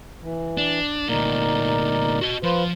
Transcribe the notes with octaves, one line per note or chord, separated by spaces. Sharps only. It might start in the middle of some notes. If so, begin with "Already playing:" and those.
E3
D4
D2 A#2 D#4 A#4 D5
F#4 D#5
F3 F4 B4 C5